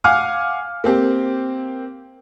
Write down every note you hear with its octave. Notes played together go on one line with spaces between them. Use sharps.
F5 F#5 G#5 D6 F6
A#3 C4 G4